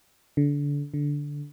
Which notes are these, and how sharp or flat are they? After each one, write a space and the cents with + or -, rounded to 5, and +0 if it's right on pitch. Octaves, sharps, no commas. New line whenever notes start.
D3 -25
D3 -10